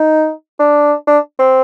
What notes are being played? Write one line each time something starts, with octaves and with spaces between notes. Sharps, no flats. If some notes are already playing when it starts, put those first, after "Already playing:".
Already playing: D#4
D4
D4
C4